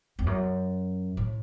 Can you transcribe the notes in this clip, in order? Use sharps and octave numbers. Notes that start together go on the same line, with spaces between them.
E2
F#2
A2